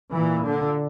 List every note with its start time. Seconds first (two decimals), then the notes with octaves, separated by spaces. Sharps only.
0.13 A#2 E3
0.44 D3